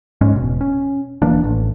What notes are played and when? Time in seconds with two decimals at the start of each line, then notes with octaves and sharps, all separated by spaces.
0.21 G#2 G#3 C#4
0.36 E1 B2
0.61 C#4
1.22 E1 E3 A#3 D4
1.44 A1